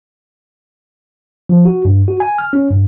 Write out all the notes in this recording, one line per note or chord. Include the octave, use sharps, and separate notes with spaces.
F3
F#4
G2
F#4
G#5
F6
C#4
G2